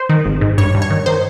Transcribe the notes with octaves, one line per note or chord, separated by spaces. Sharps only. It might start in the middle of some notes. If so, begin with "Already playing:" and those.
Already playing: C5
D#3
G#1
G#2
G2 C#5
G2
C#5
D#3
D#3 C5